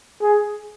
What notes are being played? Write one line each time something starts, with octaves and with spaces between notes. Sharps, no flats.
G#4